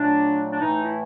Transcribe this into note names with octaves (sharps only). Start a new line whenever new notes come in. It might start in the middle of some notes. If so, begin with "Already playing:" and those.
Already playing: A#2 F#3 A3 D4
D4
A2 E3 A3 D#4
E4